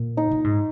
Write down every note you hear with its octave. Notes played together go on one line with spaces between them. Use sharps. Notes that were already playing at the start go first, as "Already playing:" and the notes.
Already playing: A#2
D#4
A#2
G#2